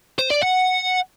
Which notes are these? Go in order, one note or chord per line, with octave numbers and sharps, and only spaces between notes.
C5
D5
F#5